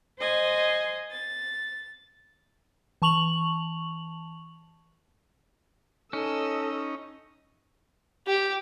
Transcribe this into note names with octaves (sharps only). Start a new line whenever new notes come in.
C5 D#5 G#5 C6
A6
E3 A5 C#6 F7 F#7
C#4 D#4 A4 D#5 E6
G4